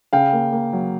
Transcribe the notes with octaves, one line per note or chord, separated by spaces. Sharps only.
C#3 F5 G5
A#3
A#3
F#3